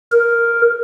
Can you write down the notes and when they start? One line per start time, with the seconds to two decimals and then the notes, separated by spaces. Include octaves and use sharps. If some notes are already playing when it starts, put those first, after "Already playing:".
0.12 A#4